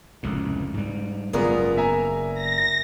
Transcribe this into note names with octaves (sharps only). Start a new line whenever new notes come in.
F1 C#2 A2
G#2 G3
F#1 B3 F4 G#4 A#4 D5
E5 G#5 A#5
A#6